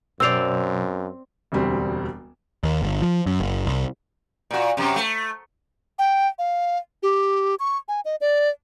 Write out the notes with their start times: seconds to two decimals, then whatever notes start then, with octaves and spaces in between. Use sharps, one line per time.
0.20 F#2 B2 F#3 C4 C5 D5 E6 F7
1.52 E1 D2 G3 C4
2.63 D#2
2.82 G1
3.02 F3
3.26 F#2
3.40 F#1
3.67 C2
4.51 A#2 F#4
4.77 F#2 C3
4.96 A3
5.99 G5
6.39 F5
7.03 G4
7.60 C#6
7.88 G#5
8.05 D#5
8.21 D5